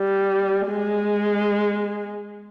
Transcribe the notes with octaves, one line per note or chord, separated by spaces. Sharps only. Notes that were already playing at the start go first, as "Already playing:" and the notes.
Already playing: G3
G#3